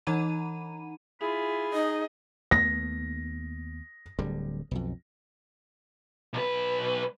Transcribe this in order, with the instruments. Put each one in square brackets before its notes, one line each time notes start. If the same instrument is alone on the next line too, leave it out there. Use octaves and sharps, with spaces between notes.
[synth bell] E3 D#4 F#5 A#5 B5 D#7
[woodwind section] E4 F4 B5 [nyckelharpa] G#4
[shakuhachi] D#4 [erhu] D#5
[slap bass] D#2 A3 B3 [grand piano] A#6
[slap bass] D1 D3 G3
B1 F2
[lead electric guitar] B1 B4